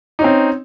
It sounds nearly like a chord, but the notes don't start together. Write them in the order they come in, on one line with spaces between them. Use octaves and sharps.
D#4 C#4 C4